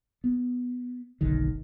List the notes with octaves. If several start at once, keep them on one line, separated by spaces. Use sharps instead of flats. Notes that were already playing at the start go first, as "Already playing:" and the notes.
B3
F#1 B1 D3 D#3